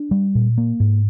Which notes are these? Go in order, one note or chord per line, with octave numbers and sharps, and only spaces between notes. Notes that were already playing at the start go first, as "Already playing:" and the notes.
Already playing: D4
G3
A#2
A#3
G#2